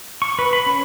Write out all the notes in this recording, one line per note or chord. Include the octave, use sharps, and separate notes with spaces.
C#6
B4
B5
C#4